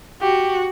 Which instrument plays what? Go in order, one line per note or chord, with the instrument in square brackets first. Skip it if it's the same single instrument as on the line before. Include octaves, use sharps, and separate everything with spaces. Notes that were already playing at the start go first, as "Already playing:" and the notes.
[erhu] F#4 [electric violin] G4